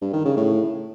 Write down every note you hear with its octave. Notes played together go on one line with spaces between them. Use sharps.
G2
D#3
C#3
A2